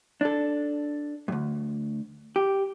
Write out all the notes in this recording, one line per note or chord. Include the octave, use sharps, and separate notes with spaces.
D4 A4
D2 G2
G4